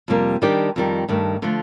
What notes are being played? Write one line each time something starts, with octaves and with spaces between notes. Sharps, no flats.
F2 C3 G3 A#3
D#3 G3 D4 G4
F2 D#3 G3
G2 D#3 A3 D4
D3 F3 A3